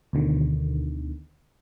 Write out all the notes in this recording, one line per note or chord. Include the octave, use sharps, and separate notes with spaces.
D2 B2 D3 D#3